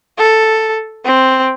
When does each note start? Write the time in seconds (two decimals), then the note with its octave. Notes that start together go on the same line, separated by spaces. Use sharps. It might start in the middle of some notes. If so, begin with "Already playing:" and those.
0.18 A4
1.05 C4